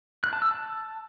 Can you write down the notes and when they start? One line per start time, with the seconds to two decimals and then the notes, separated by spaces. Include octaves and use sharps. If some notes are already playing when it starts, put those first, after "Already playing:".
0.24 F#6
0.33 A5
0.42 E6
0.51 A5